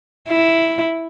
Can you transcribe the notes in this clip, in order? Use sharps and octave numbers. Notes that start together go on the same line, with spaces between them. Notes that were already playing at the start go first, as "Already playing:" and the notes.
E4